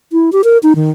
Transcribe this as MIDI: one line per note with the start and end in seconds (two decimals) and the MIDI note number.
0.12 0.30 64
0.32 0.42 67
0.44 0.58 70
0.63 0.73 63
0.76 0.90 51